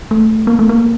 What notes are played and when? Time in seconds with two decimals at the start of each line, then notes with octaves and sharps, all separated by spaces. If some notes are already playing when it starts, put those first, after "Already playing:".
0.11 A3
0.47 A#3
0.59 A3
0.69 A#3